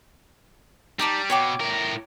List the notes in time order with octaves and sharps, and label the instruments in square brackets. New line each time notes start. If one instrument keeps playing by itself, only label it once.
[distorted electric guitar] G3 [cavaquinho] D#4 D5 A5
[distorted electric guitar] B2 [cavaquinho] C#5 G5 D6
[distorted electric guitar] A2 A#4